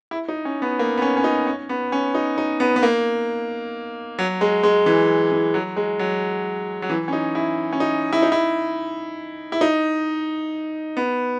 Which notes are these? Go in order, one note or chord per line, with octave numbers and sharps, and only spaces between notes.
E4
D#4
C#4
B3
A#3
B3
C#4
C#4
D#4
C#4
B3
C#4
D#4
D#4
B3
B3
A#3
F#3
G#3
G#3
E3
E3
F#3
G#3
F#3
F#3
E3
C#4
D#4
E4
C#4
D#4
E4
D#4
E4
E4
D#4
B3